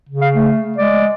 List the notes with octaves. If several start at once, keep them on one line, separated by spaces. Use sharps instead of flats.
C#3
F5
A3
G#3 D5